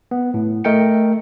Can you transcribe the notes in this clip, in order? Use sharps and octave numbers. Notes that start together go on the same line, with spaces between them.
B3
A2
A3 A#4 D#5 G5 C#7